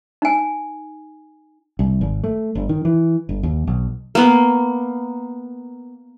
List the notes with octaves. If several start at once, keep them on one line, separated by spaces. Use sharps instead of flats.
D#4 G#5
C2
G#1
A3
G1
D#3
E3
G1
D#2
B1
A#3 B3